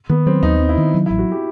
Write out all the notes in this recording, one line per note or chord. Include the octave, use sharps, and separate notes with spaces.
D#3 B3
F#3 C4
D#2 D#4
C4
E4
D#3
F#3
E4
A1
F#4
G4